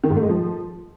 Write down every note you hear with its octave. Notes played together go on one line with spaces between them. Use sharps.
D#3
G#2
A3
G#3
F3